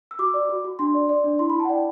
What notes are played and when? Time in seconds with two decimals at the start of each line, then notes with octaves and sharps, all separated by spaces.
0.11 E6
0.19 F#4 D6
0.34 D5
0.49 F#4
0.64 F#4
0.79 D4 C6
0.94 D5
1.09 D5
1.24 D4
1.39 E4 C6
1.50 B5
1.54 E4
1.60 A5
1.65 F#5
1.69 D5 G5